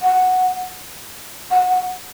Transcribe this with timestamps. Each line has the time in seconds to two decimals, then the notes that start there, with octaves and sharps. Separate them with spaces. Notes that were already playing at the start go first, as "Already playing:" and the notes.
0.02 F#5
1.51 F#5
1.70 F#5